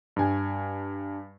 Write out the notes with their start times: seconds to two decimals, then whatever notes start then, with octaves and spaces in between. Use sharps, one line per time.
0.16 G2 G#5